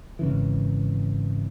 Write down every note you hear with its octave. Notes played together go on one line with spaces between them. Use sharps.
G#1 C#3 E3